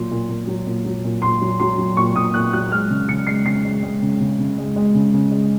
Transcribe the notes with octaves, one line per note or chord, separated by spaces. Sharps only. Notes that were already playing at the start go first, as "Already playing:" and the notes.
Already playing: A#2 F#3 C6
A#2
A#2
F#3
A#2
F#3
A#2
A#2 C6
F#3
F#3 C6
F#3
A#2 C#6
A#2 D#6
A#2 F#6
F#3 F#6
G#3 F6
C#3
C#3 C#7
G#3 C7
C#3 C7
G#3
G#3
C#3
C#3
C#3
G#3
G#3
C#3
C#3
G#3